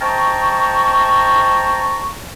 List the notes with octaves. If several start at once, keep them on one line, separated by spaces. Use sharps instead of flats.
C5 D#5 G5 A5 A#5 C#6